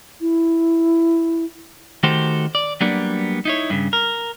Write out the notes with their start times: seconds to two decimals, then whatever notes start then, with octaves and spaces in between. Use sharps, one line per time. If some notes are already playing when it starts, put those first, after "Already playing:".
0.21 E4
2.03 D#3 A3 F#4 G4 A4 C5
2.55 D5
2.81 F#3 G3 A#3 B3 D4
3.45 D#4 E4 C#5
3.70 G2 C#3
3.93 A#4